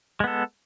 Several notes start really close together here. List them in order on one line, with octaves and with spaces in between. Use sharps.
G#3 B3 A4